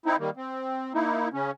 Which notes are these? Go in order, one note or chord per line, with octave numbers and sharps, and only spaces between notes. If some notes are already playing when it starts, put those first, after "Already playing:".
C4 D#4 E4
D#3 G3 A#3
C4
A#3 D#4 E4
C#3 C#4